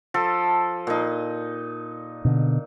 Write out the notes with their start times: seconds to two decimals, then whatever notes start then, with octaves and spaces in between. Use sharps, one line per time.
0.14 F3 A4
0.87 A#2 D#4
2.25 B2 D3